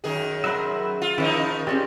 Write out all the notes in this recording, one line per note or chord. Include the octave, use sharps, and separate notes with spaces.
F#2 D#3 G#4
F#3 A#4 C5 E5 B5
F4
D#3 F3 C#4 D#4 E4
C4 C#4 G4 G#4 D5